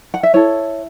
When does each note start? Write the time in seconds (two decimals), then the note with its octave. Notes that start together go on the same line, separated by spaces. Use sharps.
0.14 F#5
0.23 E5
0.34 E4 A4 C#5